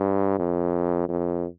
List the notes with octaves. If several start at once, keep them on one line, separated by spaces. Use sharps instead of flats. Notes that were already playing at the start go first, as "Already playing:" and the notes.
Already playing: G2
F2
F2